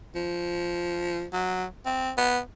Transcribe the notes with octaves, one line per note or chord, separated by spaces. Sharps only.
F3
F#3
C4
B3